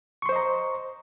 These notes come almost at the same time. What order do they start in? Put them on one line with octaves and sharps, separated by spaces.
C#6 C6 C5 D#5 A#5